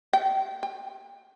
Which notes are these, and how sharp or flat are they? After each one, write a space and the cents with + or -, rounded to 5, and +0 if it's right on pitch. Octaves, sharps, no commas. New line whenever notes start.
G5 -25
G5 +20